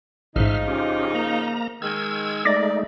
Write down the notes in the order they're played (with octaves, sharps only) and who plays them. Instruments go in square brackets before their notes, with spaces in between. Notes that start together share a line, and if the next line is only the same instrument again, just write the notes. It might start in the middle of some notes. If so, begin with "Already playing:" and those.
[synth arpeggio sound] A1 G#2 [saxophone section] C#3 F3 D#4 [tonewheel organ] E5 F6
[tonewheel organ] C#4 F4 G4
A#3 A#5
[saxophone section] D#3 G#3 [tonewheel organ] E6 G#6
[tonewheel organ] G#3 A3 D#4 [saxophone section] D5 [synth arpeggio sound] D6 A6 A#6